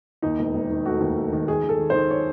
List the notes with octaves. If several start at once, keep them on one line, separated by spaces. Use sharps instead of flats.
D#2 D#4
E1
E1
D#3
A3 F#4
D#2
A3
D#3
D#3 G#4
D#3
A4
D#3
D#3 C5
C#5